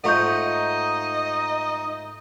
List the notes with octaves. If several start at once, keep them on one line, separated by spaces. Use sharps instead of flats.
G#2 A3 D#4 F4 D#5 F#5 C#6 G6